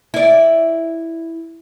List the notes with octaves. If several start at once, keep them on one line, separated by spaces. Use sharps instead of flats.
E4 D5